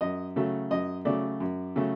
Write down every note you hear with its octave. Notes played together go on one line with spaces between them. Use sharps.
F#2 D#5
C#3 F#3 A3
F#2 D#5
C#3 F#3 A3 D5
F#2
C#3 F#3 A3